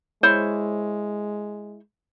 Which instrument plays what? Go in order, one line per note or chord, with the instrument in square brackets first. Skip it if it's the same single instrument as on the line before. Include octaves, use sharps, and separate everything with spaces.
[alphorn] G#3 [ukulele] E4 C5 C#5